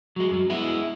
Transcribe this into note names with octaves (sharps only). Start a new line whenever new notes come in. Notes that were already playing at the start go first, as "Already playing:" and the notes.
F#3 G#3
F#2 F#3
G#3 B3 E4